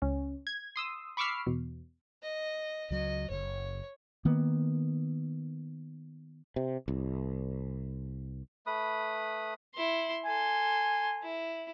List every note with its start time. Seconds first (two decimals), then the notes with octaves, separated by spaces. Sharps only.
0.02 C#2 C#4
0.47 G#6
0.76 C6 D#6 E6
1.17 B5 C#6 D6 E6 F6 C7
1.47 E2 B2
2.23 D#5
2.91 C#2 F#3 D#5
3.30 F#1 C#5
4.25 D#3 A#3 B3
6.56 C3
6.88 C2
8.67 A3 B4 B5 D#6
9.74 E4 C6
10.25 A4 G#5 C6
11.23 E4